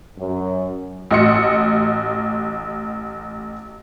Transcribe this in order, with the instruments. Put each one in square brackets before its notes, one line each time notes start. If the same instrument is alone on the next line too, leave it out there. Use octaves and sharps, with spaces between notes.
[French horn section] F#2
[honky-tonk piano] A1 F#4 D#5 C6 C#7